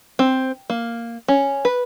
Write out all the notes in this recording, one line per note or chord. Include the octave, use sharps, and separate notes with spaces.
C4
A#3
C#4
B4